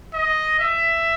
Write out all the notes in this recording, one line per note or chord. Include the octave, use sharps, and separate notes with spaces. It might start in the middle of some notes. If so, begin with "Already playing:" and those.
D#5
E5